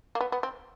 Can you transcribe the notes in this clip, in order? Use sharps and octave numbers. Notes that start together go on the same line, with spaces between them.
A#3
B3
B3
C4